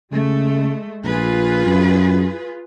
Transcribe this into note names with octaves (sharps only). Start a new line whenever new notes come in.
C#3 G#3 A3
A#1 F4 G#4 B4
F#2